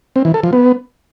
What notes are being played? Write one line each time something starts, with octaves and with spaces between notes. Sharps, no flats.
C4
E3
A4
F3
B3